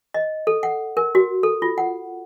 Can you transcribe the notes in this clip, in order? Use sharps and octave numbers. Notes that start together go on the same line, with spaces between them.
D#5
A4
F#5
A#4
F#4
A4
F4
F#5